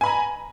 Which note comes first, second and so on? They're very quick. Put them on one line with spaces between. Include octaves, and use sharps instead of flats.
G#5 B5 A#5